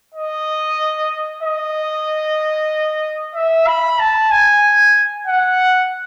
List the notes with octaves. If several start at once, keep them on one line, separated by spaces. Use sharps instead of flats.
D#5
D#5
E5
B5
A5
G#5
F#5